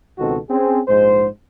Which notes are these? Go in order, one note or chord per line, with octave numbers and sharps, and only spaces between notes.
C#2 B2 D#3 C4 F#4 A4
C4 C#4 G#4
A#1 G#2 G#3 C5